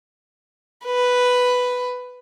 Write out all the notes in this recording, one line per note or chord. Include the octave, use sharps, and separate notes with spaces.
B4